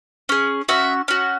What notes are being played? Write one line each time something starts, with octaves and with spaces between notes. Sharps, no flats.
C#4 G#4
C#4 F#4 E5
C#4 F#4